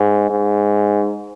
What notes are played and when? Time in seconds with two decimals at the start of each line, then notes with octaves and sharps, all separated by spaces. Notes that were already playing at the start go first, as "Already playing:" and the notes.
Already playing: G#2
0.30 G#2